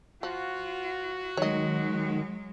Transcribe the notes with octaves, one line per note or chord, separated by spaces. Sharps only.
F3 F4 F#4
D#3 F#3 G#3 C#5 D#5